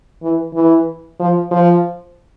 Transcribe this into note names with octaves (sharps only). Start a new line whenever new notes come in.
E3
E3
F3
F3